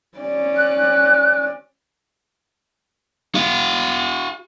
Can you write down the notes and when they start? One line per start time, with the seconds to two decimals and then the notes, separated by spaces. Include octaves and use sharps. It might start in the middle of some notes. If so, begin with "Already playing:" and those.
0.18 C#4 D5
0.56 F#6
3.35 F#4 F5